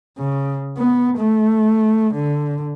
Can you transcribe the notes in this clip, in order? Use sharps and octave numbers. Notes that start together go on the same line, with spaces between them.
C#3
B3
A3
D3